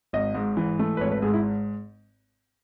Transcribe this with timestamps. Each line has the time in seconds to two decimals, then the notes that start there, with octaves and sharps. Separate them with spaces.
0.13 G#1 D#5
0.35 G#2
0.57 E3
0.79 A3
0.97 B4
1.01 G#1 C#5
1.12 B4
1.22 G#2 G#4
1.33 E4